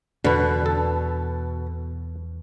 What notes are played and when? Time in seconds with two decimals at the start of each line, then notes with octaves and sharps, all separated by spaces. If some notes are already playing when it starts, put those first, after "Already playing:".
0.24 E2 B2 D3 B4
0.66 A4